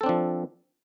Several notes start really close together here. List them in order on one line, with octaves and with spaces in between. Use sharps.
A4 C4 D4 F3